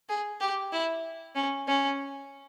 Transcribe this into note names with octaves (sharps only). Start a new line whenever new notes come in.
G#4
G4
E4
C#4
C#4